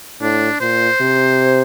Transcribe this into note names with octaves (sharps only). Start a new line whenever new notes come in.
A2 D4
A#2 C5
C3